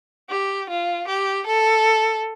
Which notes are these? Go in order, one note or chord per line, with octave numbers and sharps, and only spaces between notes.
G4
F4
G4
A4